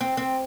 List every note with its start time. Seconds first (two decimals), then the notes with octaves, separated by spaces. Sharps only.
0.01 C4
0.17 C4